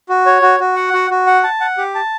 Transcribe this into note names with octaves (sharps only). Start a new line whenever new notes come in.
F#4
C#5
F#4
F#4
F#5
F#4
F#4
F#5
A5
F#5
G4
A5